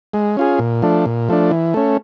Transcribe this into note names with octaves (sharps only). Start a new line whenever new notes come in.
G#3
C#4 F4 G#4
A#2
F3 A3 D4
A#2
F3 A3 D4
E3
A3 C#4